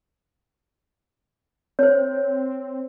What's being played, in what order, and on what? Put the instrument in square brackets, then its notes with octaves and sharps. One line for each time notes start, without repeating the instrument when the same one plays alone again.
[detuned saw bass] C4 [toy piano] C5 C#5